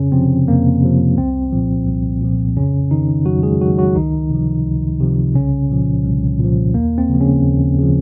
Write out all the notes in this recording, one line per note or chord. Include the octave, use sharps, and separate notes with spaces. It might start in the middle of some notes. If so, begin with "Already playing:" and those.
Already playing: F2 C#3 C#4
C3 F3 C4
F2 A#3
C3 F3
C2 C4
A#2 F3
C2
A#2 F3
F2 C#3 C#4
D#3 D#4
F2 F#3 F#4
G#3 G#4
D#3 F#3 F#4
F#3 F#4
C#2 D#3 D#4
C3 F3
C#2
C3 F3
C2 C#3 C#4
A#2 F3
C2
A#2 F3
D#2 A#3
C4
C#3
F3
C#3 C#4
D#2
C#3 F3